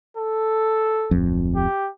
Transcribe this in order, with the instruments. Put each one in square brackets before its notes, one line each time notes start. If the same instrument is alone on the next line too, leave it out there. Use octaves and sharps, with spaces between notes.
[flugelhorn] A4
[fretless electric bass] D1 F2
[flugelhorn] G4